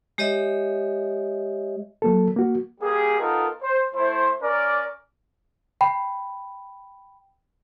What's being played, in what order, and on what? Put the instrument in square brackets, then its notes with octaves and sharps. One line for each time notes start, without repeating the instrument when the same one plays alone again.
[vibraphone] G#3 G4 C#5 D#5 E5
[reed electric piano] F#3 A#3 A4
A#3 F#4
[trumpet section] G3 A#3 G4 G#4
B3 D#4 F4 A4 A#4
C5
A3 E4 C5
C#4 A#4 D5
[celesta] G5 B5